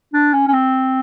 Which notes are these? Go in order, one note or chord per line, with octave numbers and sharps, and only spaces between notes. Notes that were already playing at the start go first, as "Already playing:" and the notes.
D4
C#4
C#4
C4